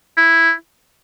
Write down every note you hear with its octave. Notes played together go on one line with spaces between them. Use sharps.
E4